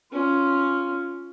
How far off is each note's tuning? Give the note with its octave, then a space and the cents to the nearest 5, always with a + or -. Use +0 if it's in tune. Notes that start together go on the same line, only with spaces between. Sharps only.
C#4 +5 F4 +0